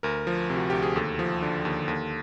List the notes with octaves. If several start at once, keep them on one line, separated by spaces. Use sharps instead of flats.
D2 A#4
F3
C3
F#4
D2 G4
G#4
D#2 A4
F3
D3
D#2
D#2